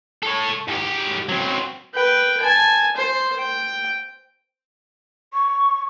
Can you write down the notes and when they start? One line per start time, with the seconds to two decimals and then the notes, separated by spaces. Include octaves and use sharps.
0.23 A4 C#5
0.68 G#2 G4
1.29 F#3 C4
1.95 B4 G5
2.40 G#5 A5
2.96 C5
3.39 G5
5.33 C#6